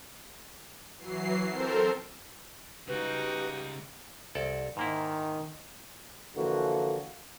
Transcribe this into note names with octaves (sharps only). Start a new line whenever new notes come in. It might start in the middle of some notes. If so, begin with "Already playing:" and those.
E3 F#3 C7
C4 A4 A#4 C5
C#3 G3 G#3 D#4 F#4 G4 B4
C2 A4 D5
G#2 D#3 A#3 E4
D3 E3 F3 A#3 F#4